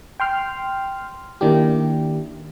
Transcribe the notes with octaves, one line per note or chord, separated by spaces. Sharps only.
G5 C6 F6
D#3 A#3 D4 E4 G4